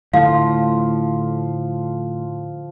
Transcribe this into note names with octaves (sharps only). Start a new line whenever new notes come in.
A2 D3 F3 A3 F5